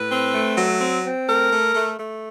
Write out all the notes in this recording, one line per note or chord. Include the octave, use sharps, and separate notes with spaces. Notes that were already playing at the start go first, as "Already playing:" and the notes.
Already playing: A2 B4
C4
A3
F#3
C4
C4
A3 A#4
A3
A3
A3